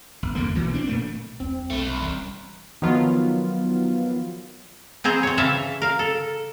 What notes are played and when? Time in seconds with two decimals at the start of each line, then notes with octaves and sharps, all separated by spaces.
0.23 G1
0.35 E2 D3 A#3
0.55 B1 B2 E3 F#3
0.74 C4 D4
0.87 A#2 A3 A#3
1.40 E2 G3 C4
1.71 B1 G2 A3
1.83 C2
2.00 E3 C#4
2.82 D#3 F3 F#3 B3 F4
5.04 E3 C4 G#4 C5 A#5
5.23 C4 C#5
5.37 C#3 E3 E5 F5 A5
5.82 A#4 F5
5.99 A4